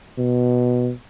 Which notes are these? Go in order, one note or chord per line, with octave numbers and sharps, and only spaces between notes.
B2